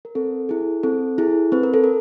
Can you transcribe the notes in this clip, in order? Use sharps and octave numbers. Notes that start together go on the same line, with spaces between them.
A#4
C4 A4
E4 G#4
C4 A4
E4 G#4
C4 B4
A#4
A4
A#4